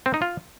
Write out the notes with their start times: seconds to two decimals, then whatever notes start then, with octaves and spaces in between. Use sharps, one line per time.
0.06 C4
0.14 D#4
0.22 F4